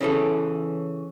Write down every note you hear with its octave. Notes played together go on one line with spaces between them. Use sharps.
C#3 E3 C#4 A4